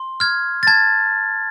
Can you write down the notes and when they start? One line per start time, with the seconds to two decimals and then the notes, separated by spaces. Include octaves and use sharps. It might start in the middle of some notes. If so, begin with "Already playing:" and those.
Already playing: C6
0.20 F6 G#6
0.63 A6
0.67 A5 G#6